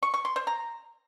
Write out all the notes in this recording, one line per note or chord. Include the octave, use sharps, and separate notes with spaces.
C#6
C#6
C6
C5
A#5